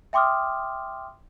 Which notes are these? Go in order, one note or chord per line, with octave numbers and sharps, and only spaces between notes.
E5 G5 C6 D6 D#6 F6